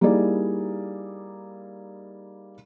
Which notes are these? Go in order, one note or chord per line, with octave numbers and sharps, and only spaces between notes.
G3 A#3 D#4 E4 G#4 D5